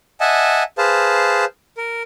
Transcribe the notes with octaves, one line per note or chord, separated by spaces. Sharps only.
D#5 E5 F#5 G#5 A5
G#4 B4 C5 F5 A5
A#4